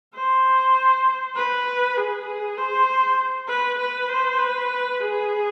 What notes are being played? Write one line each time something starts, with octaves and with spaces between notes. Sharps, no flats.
C5
B4
G#4
G#4
C5
B4
B4
C5
B4
G#4